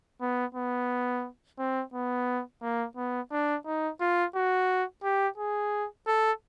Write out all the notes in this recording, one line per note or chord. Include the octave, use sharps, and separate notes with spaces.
B3
B3
C4
B3
A#3
B3
D4
D#4
F4
F#4
G4
G#4
A4